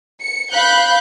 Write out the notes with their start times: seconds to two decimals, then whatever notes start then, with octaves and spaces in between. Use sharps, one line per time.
0.20 C#7
0.52 F5 B5 F#6 G6